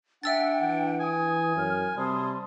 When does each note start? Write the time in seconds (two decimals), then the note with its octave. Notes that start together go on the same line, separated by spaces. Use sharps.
0.23 D4 E5 F#5 G5 E6 A6
0.62 E3
1.00 G#5 D#6
1.56 F#2 F6
1.97 C3 G3 A5 C6 D#6